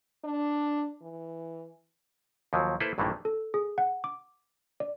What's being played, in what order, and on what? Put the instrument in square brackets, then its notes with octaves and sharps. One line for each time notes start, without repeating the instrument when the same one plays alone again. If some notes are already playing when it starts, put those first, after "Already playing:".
[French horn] D4
E3
[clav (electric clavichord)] D#2 F3 F#3
A#3 E4 A4 B4 C5
A#1 G2 D#3 E3 A3 A#3
[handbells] A4
G#4
F#5
D6
D5